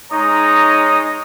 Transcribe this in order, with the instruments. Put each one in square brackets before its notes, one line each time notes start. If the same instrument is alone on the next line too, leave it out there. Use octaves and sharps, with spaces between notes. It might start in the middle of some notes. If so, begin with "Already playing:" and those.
[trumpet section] G#3 D#4 C#5 A#5 D#6